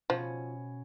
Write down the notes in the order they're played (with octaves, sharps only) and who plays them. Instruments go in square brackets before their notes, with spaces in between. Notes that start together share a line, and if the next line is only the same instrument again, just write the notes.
[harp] B2 C#4 [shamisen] F3